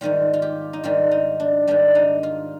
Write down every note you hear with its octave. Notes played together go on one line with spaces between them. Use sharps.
G#2 D#3 G3 F4
F4
G4
D#4
G#2 D#3 G3 F4
D#4
D4
G#2 D#3 G3 D4
D#4
F4